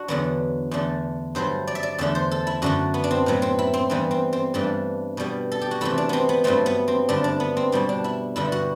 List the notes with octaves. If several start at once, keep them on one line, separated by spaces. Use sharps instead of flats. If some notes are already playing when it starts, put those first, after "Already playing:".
Already playing: D4 F#4
E2 D3 F#3 B3
E2 D3 A3
G2 F#3 A3 C5
D5
E5
D5
E2 D3 A3 E5
C5
A4
E4
F#2 D3 A3 F#4
B3
D4
C4
A2 F#3 B3
C4
E4
C4
G2 E3 G3 B3 C4
C4
C4
G2 E3 A3 D4
B2 G3 B3
A4
G4
F#4
C3 E3 A3 E4
D4
B3 C4
B3
G2 F#3 A3 C4
B3
C4
G2 D3 A3 D4
D4
B3
C4
B2 G3 B3 D4
D4
E4
G2 D3 G3 B3 E4
F#4